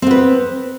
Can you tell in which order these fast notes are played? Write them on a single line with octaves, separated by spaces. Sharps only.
C4 B3 B4